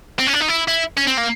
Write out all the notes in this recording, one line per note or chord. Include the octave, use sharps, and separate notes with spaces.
C4
C#4
D4
D#4
E4
E4
C#4
C4
A#3